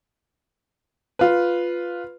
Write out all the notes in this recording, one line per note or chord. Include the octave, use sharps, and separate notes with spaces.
F4 B4